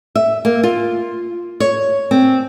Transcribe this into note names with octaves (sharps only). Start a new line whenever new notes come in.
E5
A#3
F4
C#5
C4